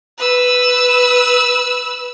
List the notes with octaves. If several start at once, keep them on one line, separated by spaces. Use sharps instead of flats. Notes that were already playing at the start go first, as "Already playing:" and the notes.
B4 E6